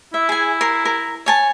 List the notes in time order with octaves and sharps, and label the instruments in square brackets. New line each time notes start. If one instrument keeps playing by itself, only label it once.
[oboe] E4 [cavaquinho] E5
[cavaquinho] G#4 G#5
A#4 C6
A#4
C#5 G#5 A5